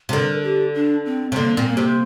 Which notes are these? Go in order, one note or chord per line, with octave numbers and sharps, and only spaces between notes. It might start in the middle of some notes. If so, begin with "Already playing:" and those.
C3
D3 A#4
G4
D4
C4
C3
D3 A#3
A#2 C4
A#3
C3